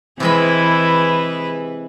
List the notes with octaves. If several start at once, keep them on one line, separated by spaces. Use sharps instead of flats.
C3 E3 G#3 E4 G#4 B4 B5